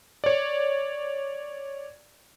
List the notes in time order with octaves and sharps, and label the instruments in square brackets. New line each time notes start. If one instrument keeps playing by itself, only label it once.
[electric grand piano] C#5 D5